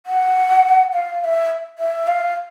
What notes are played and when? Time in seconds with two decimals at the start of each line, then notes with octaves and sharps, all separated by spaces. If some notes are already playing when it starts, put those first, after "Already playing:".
0.06 F#5
0.93 F5
1.21 F5
1.24 E5
1.78 E5
2.07 F5